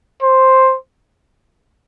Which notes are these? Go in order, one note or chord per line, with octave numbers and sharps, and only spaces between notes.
C5